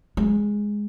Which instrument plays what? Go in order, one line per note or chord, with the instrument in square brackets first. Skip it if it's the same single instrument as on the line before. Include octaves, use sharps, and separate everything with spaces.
[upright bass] G#3